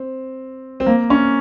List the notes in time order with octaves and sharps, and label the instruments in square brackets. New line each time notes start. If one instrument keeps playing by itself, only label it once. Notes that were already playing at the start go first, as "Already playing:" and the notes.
Already playing: [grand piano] C4
C4
A#3
C#4